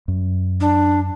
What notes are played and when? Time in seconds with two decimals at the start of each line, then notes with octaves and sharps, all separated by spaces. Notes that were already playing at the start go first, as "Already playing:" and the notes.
0.08 F#2
0.61 D4